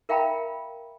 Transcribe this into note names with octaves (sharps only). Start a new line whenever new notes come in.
A#4 E5 F5 G5 A#5 B5